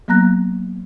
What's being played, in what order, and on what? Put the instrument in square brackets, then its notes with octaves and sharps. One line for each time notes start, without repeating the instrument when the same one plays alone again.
[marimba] F#3 A#3 B3 A#5 F#6 A#6